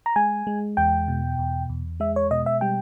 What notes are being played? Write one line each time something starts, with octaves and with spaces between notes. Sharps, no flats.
A#5
G#3 G#5
G#3
E2 G5
B2
E2
E2
G#3 E5
C#5
B2 D#5
E5
G3 G5